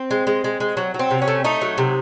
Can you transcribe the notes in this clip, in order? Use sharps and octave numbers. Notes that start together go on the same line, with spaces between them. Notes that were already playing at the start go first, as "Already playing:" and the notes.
Already playing: C4
G#3
G#3
G#3
G#3
F#3
F#3
C4
C3
C#4
A3
A3 D#4
F#3
C3